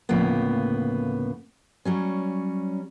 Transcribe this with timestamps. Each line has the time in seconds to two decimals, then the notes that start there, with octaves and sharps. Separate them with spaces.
0.09 D2 A2 C#3 F3 A#3 B3
1.85 F#3 G3 C#4